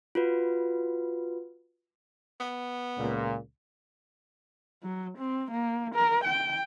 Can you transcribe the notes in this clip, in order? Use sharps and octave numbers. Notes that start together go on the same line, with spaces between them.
F4 F#4 B4
B3
C#2 A#2
F#3
C4
A#3
A#4
G5